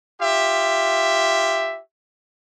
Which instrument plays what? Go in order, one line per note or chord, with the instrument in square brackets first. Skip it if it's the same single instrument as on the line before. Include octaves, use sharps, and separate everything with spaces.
[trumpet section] F4 G4 E5